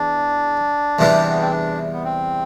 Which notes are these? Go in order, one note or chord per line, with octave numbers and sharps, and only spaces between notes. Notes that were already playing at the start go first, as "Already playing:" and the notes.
Already playing: E2 D4
E2 C3 E3 G3
B3
C4
D4
B3
C4